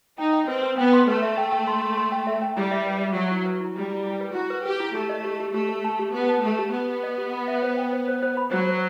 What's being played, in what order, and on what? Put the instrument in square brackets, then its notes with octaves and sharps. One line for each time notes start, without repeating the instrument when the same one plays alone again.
[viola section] D#4 [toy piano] G5
[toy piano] G5
[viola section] C4 [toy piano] B4
[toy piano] B4
[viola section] B3 [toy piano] G5
[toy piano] C6
[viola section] A3 [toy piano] B4
[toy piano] E5
G5
G5
C6
C6
C6
G5
E5
G5
[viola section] G3 [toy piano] E4
[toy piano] E5
B4
E5
[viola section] F#3 [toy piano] E5
[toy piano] E4
B4
E4
[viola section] G3 [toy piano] E4
[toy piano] E4
E4
B4
[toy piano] E4 [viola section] F#4
[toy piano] B4
[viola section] G4 [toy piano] B4
[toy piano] E4
[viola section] A3 [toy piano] G4
[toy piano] D#5
G4
G4
[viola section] A3 [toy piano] G4
[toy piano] G4
A5
G4
[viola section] B3 [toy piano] G4
[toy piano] A5
[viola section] A3 [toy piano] A5
[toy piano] G4
[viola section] B3 [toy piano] G4
[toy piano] G4
D#5
G4
B5
E5
C5
G5
C5
C5
C5
B5
[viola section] F#3 [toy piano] C5
[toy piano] C5